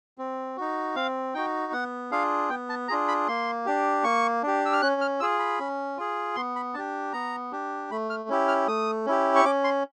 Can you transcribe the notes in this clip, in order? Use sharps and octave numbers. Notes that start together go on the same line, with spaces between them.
C4
D#4 F#4
C4 F5
D#4 F#4 G5
B3 F#5
D4 F4 G#4 F5
B3 G5
A5
D4 F4 G#4 A#5
B5
A#3 C6
D4 G4
A#3 C#6
D4 G4
E6
F6
C#4 F#6
F6
F4 G#4 E6
B5
C#4
F4 G#4
B3 C6
B5
D4 G4 A5
B3 A#5
D4 G4
A3 B5
F6
C#4 E4 G4
F6
A3 D#6
C#4 E4 G4
C#6
C#4 D6
C6